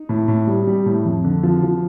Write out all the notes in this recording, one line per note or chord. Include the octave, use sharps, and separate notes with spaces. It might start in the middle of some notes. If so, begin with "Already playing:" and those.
Already playing: D#4
A2
A2
G3
G3
A2
F2
D3
F3
F3